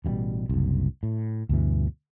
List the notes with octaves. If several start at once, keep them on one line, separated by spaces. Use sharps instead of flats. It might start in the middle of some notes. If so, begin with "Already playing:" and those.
A1 G2 B2 G3
F#1 C2
A2
D2 G2 B2 E3